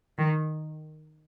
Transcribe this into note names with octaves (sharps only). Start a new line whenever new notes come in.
D#3